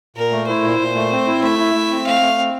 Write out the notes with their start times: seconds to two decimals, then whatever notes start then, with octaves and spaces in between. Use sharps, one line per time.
0.16 A#2 A#4
0.31 A3
0.47 E4 C5
0.64 A#2
0.80 A#2
0.95 A3
1.11 C4
1.26 E4
1.43 A3 E5
1.59 E4
1.75 A3
1.91 C4
2.06 A3 F5
2.21 A3
2.38 C4